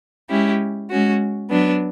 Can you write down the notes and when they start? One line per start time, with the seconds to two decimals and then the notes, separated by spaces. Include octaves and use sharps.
0.29 G#3 C#4 E4 G4
0.90 G#3 C#4 F#4
1.50 F#3 B3 D4